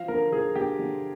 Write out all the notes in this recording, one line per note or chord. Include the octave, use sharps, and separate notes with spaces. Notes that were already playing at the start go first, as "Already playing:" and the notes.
Already playing: F3 F5
D3 A#4
D3 G#4
D3 G4
D3